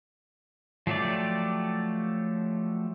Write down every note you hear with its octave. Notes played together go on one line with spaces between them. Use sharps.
F3 F#3 A3 G4 D5